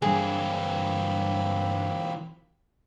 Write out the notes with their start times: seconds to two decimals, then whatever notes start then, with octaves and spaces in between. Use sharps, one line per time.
0.02 G2 E3 F#3 A#3 C4 G#4 B5